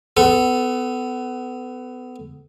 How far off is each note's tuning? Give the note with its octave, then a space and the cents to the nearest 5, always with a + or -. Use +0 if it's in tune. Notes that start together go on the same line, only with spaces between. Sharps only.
B3 +25 A4 +0